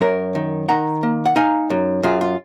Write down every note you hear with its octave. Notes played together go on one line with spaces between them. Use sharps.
F#2 A#4 C#5
D#3
D#3 F#5 A#5
A#3
F#5
D#4 F5 G#5
F#2
F#2 F4 G#4
F4